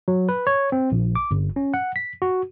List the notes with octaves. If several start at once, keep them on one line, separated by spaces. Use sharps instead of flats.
F#3
B4
C#5
C4
A#1
D6
G1
C#4
F#5
B6
F#4